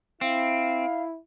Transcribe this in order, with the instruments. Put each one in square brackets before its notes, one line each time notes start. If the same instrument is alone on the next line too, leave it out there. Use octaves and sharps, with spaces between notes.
[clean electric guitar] C4 [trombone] E4 [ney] F5